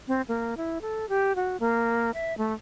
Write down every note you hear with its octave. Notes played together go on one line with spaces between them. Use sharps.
C4
A#3
E4
A4
G4
F#4
A#3
E5
A3